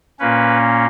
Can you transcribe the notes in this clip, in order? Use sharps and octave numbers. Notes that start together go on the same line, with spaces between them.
A#2 A#3 C#4 B4